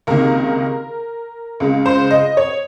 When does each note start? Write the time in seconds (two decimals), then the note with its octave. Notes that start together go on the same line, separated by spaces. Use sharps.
0.07 C#2 C3 D#3 A#3 A#4
1.60 C#2 C#3 G#3
1.86 C5
2.11 D#5
2.37 C#5